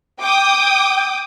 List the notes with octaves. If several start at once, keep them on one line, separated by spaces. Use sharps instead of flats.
G5 D6 D#6